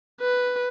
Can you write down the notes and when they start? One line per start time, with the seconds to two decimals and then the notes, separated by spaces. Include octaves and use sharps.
0.21 B4